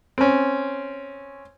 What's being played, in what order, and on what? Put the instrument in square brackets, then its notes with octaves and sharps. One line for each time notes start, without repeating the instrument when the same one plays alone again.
[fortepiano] C4 C#4